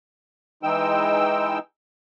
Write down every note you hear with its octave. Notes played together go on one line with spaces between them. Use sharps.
E3 G#3 D#4 G5 E6